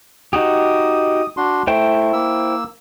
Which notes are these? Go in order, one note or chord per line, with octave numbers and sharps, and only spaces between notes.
D#4 F#4 G4 D#6
D4 F#4 C6
A3 E4 C5 G5
A#3 E6